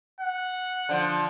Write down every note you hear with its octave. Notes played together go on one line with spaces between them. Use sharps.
F#5
D3 F3